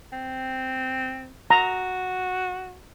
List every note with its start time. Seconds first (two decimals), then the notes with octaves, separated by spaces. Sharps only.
0.12 C4
1.50 F#4 A#5